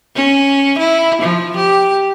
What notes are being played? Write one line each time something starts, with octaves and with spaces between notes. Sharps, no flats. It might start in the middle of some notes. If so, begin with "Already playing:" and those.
C#4
E4
F3
G4